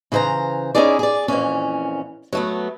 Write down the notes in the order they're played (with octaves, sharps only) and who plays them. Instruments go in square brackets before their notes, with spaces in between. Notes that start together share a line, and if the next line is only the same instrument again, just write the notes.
[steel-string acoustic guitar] C#3 E3 C5 E5 A#5
C#4 D#4 E4 G4 G#4 D5
G#4 D5
F2 A#2 E3 C#4
F#3 A3 B3